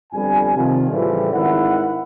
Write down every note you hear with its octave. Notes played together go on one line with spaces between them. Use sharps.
G1 F2 G3 G#5
C3 D#3 F3
A2 C#3 E3 F3 G3 A3
G#1 D#3 E4 F#5